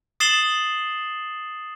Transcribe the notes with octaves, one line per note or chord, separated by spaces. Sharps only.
D#6 A6 C7 E7 F#7 G7